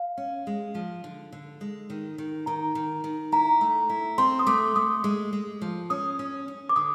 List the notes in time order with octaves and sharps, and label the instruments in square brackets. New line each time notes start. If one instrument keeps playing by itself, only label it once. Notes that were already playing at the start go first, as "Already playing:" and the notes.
Already playing: [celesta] F5
[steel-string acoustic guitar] C#4
G#3
F3
D3
D3
G#3
D#3
D#3
[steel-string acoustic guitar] D#3 [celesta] A#5
[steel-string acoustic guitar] D#3
D#3
[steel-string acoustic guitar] E4 [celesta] A#5
[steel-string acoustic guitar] A3
E4
[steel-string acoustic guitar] C4 [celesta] C6
[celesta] D#6
[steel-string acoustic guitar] A3 [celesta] D6
[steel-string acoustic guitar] A3 [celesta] D#6
[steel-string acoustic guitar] G#3
G#3
F3
[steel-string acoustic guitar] C#4 [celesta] D#6
[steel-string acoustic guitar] C#4
C#4
[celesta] D6
[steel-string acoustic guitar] D3 [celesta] D#6